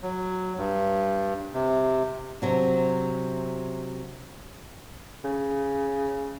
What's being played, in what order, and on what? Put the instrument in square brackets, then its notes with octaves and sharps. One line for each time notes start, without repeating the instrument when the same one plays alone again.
[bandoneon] F#3
G2
C3
[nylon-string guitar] C3 F#3 D4
[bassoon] C#3